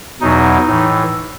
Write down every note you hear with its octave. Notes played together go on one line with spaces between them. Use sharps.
E2 B2 F#3 D#4
A2 E3